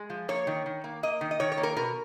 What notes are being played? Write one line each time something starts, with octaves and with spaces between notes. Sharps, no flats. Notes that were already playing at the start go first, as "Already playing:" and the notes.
Already playing: G#3
F3
A#3 C#5
D#3
D#3
A#3
A#3 D#5
D#3
D#5
D#3 C#5
C#5
A#3
A#4
B2 A#4